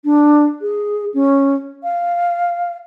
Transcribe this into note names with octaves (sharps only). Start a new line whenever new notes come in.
D4
G#4
C#4
F5